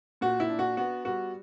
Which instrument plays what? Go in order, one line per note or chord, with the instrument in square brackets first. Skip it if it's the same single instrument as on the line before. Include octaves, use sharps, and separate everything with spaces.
[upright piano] A#2 F#4
E4
D4
F#4
B3 F#4
G3 F#4